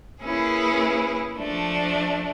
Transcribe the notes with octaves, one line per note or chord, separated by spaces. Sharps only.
A#3 C#4 E4 G#4 B4
F3 A3 D4